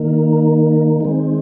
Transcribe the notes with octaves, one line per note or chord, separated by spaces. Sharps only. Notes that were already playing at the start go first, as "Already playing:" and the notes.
Already playing: D#3 A#3
D#3 G#3 C4